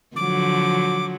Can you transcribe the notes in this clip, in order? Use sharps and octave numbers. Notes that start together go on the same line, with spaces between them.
D3 F3 F#3 D6